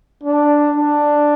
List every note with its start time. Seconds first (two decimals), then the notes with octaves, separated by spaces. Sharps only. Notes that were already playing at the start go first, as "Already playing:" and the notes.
0.23 D4
0.76 D4